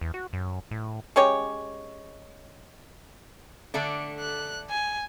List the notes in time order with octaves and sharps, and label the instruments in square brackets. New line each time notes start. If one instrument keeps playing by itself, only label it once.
[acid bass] E2
F#4
F#2
A2
[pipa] G#3 C#4 G4 C#5
[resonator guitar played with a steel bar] D3 A3 D4
[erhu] F#6
G#5